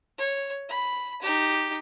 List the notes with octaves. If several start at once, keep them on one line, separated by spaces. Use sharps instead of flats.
C#5
B5
D#4 G4